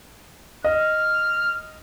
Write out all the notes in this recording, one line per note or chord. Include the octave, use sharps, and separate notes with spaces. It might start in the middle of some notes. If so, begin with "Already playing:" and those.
D#5 F6